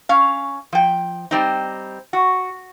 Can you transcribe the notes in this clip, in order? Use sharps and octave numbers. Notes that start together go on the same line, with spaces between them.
C#4 F5
F3 G5
G3 C4 D#4
F#4